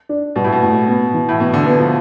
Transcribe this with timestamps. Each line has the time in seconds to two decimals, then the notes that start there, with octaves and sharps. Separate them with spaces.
0.09 D4
0.36 B2 G3
0.44 A2
0.52 B2
0.62 A2
0.88 B3
1.14 E3
1.29 A2
1.40 B2 B3
1.54 D3
1.66 E3 B3
1.79 F3